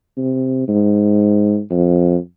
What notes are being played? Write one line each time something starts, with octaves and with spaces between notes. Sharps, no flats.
C3
G#2
F2